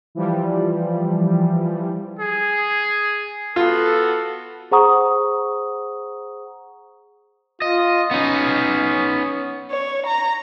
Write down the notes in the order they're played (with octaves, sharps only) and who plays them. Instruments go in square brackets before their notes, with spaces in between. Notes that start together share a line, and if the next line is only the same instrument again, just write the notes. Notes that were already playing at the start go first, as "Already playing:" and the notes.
[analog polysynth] E3 F3 G3
[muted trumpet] G#4
[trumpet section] B3 F#4 A4 [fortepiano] F4
[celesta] G#4 C5 F#5 A#5 C#6 D#6
[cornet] F4 [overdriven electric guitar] D#5
[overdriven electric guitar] B3 D#4 [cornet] C#4
[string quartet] C#5
A#5